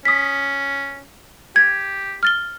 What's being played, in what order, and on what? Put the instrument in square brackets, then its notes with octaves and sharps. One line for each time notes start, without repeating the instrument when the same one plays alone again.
[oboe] C#4 [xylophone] D#6 B6
[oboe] G4 [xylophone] G#6
[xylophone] F6 A6 G7